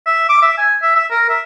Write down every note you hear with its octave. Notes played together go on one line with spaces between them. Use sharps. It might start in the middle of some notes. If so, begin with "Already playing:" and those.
E5
D6
E5
G#5
E5
E5
A#4
E5